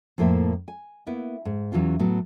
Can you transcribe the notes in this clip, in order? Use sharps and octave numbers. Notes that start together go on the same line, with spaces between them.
F2 A2 A#3 C5 E5
G#5
A#3 B3 E4
G#2
E2 E3 F#3 C#4 F4
A2 F#3 B3